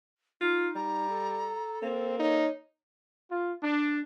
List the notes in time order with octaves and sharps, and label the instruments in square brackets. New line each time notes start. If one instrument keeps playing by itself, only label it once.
[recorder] D#4 [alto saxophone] F4
[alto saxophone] G3 [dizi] A#5
[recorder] A4
[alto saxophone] A#3 [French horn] C4
[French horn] D#4 [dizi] C#5
[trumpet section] F4
D4